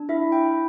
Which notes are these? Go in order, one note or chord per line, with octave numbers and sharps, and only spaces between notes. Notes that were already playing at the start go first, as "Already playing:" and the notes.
Already playing: D4
E4 E5
G5
E4